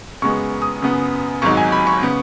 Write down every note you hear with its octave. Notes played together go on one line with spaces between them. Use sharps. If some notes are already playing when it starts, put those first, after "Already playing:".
F#2 C#3 G#3 B3 C#6
D#6
F#2 C#3 B3
G#1 G#2 F#3 D#4 C#6
G#5
B5
C#6
C#3 B3